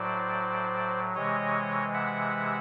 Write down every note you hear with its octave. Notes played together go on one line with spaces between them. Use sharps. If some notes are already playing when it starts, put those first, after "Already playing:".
Already playing: A2 F#3 C5 D5
C3 E3 G#3 C#5 D#5
E5 F#5